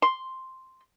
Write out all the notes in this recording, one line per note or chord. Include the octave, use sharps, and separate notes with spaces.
C6